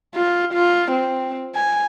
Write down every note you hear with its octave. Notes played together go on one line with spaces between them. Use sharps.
F4
F4
C4
G#5